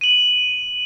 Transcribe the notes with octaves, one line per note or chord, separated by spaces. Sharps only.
D#7 F#7